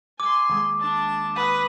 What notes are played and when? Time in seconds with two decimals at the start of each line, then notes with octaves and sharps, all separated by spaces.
0.20 G#5 C6 D6
0.49 D#2 G#3
0.80 D4 A5
1.36 B4 D#6